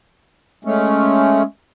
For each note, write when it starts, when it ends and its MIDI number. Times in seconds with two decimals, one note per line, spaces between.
0.65 1.42 56
0.65 1.42 57
0.65 1.42 61